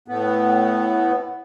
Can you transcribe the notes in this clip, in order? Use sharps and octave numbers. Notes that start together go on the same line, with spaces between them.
A2 B3